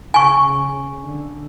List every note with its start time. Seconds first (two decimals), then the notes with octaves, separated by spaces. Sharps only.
0.14 C#3 G#5 C#6
1.03 D3